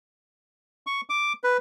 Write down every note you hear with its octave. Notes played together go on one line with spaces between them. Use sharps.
C#6
D6
B4